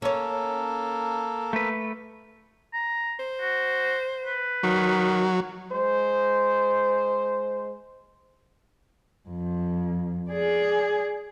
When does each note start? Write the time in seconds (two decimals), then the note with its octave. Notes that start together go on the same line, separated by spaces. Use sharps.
0.02 A#3 C#4 A4 C#5
1.53 A3 B4
2.73 A#5
3.19 C5
3.41 F#4
4.25 B4
4.63 D#3 F#3
5.72 G#3 C5
9.29 F2
10.30 G#4 D5